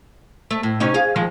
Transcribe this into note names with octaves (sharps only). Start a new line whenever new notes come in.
A3
A2
C3 C#4 D#4
G#4 F5
D#3 F3 G#3